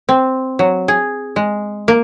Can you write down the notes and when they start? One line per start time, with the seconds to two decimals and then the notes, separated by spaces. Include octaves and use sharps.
0.09 C4
0.59 F#3
0.88 G#4
1.36 G#3
1.88 A#3